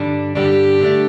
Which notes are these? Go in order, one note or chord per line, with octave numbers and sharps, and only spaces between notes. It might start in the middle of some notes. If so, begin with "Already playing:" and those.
Already playing: G2 D3 G3 D4
G2 D3 G3 D4 G4
D3 A3 D4